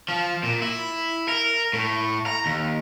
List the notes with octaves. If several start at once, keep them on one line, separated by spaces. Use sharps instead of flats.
F3
A#2
E4
A#4
A2
A#5
D#2